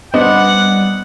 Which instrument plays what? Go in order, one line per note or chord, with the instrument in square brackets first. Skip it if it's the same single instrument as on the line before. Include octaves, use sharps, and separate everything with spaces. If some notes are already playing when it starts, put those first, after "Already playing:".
[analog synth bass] G3 [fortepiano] B3 D4 C5 [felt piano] D#5 [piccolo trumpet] F#5